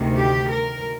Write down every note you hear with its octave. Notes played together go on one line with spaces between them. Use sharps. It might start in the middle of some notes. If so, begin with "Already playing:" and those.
Already playing: D2 C3 D#3
G4
A#4